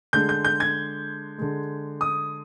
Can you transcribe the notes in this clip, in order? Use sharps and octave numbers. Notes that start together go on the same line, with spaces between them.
D3 G#3 G6
G6
G6
G#6
D3 G#3
D#6